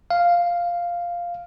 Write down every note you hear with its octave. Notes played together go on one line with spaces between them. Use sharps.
F5